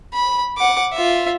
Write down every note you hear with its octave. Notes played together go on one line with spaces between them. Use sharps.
B5
F#5 D6
F4 E5